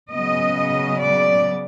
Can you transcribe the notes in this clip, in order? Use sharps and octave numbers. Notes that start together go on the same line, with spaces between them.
C#3 F#3 B3 D#5
D5